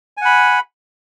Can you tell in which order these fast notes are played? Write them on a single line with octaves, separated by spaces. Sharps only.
G#5 F#5 B5